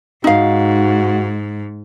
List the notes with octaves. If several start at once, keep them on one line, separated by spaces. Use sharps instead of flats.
G#2 D#4 F#4 F5